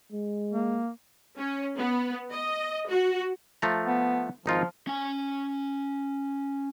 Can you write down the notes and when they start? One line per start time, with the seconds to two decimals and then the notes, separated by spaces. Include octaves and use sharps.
0.12 G#3
0.53 A#3
1.38 C#4
1.77 B3
2.33 D#5
2.89 F#4
3.62 F3 A3 A#5
3.86 B3
4.46 G#1 F3 D#4 F4
4.87 C#4 G#5